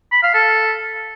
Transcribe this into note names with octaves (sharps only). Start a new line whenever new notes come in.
B5
F5
A4